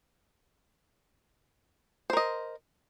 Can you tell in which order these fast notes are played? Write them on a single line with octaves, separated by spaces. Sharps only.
C5 A#4 D#5